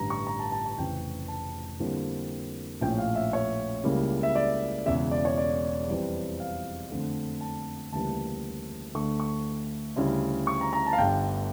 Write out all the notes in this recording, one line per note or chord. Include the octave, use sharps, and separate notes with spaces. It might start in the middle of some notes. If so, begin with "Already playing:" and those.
Already playing: A1 G2 D3 A#5
C#6
A#5
A5
A5
A5
F1 F2 C#3 E3 G5
A5
F2 D3 G3 A#3 E4
A#1 A2 F3 C#4 G5
F5
E5
C#5
C#2 C#3 G3 A#3 E4
E5
D5
E1 E2 C#3 E5
D5
C#5
D5
F2 E3 G3
F5
F2 D3 A3
A5
D2 C#3 E3 G3 A#3 A5
D2 D3 A3 C#6
C#6
D2 C#3 G3 C#4 E4
C#6
A#5
A#5
A5
F5
G1 G2 D3 G5